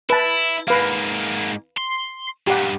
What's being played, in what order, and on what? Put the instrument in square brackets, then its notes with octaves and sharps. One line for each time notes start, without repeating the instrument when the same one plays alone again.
[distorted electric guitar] E4 [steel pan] B4 A5
[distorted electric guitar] G#2 A#3 [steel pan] B4 F5
[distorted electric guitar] C6
[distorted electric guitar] G2 A#2 [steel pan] G4 F#5